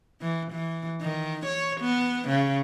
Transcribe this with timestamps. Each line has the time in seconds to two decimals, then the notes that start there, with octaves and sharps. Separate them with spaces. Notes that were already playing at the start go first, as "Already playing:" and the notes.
0.21 E3
0.52 E3
1.01 D#3
1.46 C#5
1.81 B3
2.28 C#3